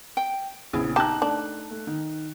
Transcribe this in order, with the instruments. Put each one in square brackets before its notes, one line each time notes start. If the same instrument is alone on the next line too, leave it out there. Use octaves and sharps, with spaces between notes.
[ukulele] G5
[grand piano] A#1 C#3 B3 [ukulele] E4 G#4
[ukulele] D#4 A5 [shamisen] G4 [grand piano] A#5 F#6
[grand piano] A3 [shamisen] D4
[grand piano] A3
D#3